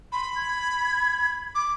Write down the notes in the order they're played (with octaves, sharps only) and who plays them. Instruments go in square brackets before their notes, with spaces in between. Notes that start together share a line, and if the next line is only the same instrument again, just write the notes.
[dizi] B5 [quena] C6
[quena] G#6
[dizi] D6